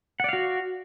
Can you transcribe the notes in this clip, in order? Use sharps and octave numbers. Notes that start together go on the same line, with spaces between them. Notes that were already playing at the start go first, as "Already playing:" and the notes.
F#4 D5 F5 F#5